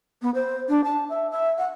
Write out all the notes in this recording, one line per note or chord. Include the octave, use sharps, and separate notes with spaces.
B3
C5
D4
A5
E5
E5
F#5